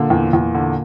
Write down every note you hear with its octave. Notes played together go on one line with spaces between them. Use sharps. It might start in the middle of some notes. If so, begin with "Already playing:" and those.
Already playing: A#2 D3
E2
E2
D3